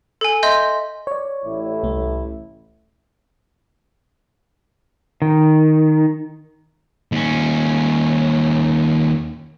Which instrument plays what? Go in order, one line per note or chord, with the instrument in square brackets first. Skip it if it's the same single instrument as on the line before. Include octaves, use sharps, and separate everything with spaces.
[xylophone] A4 G#5
D#5 E5 C6 G6
[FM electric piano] C#5 D5
[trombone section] A1 A2 E4
[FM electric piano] C2 A3
[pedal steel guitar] D#3
[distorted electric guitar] D#2 C#4